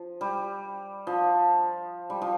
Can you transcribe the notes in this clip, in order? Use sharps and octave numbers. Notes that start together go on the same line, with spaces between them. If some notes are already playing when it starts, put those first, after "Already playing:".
Already playing: F3
G3
F3
G3
F3